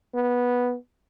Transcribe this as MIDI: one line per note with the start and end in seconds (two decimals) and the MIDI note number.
0.14 0.76 59